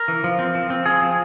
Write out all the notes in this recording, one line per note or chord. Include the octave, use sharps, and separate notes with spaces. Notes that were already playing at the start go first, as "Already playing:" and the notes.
Already playing: A#4
E3
F3
C4
F3
C4
F3 G#4
F3